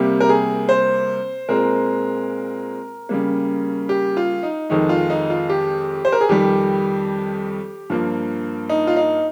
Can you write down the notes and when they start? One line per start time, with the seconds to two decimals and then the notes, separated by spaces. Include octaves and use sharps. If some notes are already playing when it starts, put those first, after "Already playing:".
Already playing: C3 G3 A#3 G4
0.20 A#4
0.29 G#4
0.69 C5
1.49 A#2 G#3 C4 A#4
3.09 C#3 G3 A#3
3.89 G4
4.17 F4
4.43 D#4
4.69 F2 D#3 G#3 D#4
4.89 F4
5.10 D#4
5.30 F4
5.50 G4
6.05 C5
6.12 A#4
6.21 G#4
6.29 F2 D#3 G3 G4
7.90 G2 F3 A#3
8.69 D#4
8.87 F4
8.97 D#4